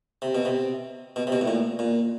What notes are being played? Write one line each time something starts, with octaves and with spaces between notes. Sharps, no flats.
C3
B2
C3
B2
C3
B2
A2
A#2
A#2